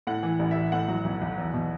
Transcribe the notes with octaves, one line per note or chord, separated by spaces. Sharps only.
A2 F#5
E3
A1
A1 E5
A2 F#5
F#3
B1
B1
E2
B2